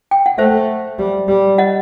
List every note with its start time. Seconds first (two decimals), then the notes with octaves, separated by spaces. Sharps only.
0.11 G5
0.26 F#5
0.38 A3 C5 E5
0.99 G3
1.28 G3
1.58 D#5 F#5